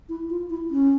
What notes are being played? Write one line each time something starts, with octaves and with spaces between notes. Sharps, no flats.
E4
F4
E4
C#4